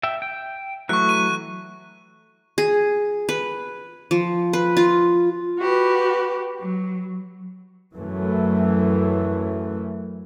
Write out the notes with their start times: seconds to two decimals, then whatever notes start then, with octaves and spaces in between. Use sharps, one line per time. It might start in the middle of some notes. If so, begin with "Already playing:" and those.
0.03 E5 G5
0.22 G5
0.89 E3 F#3 A3 C#6 F#6
1.09 D#7
2.58 G#4
3.29 B4
4.11 F3
4.53 B4
4.77 F4
5.58 F#4 G4 B4
6.60 F#3
7.95 F#2 E3 A3